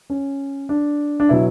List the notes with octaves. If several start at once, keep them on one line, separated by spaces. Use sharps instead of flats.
C#4
D4
D4
B2 F#3 E4